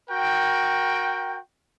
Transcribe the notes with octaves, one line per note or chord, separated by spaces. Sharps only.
F#4 A#4 G5